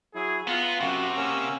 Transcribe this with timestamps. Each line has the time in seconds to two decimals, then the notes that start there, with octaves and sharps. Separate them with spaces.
0.15 F#3 E4 G#4
0.47 B3 F4 F#5 A#5
0.81 F#2 C3 F#4
1.16 A#3 C#4 E6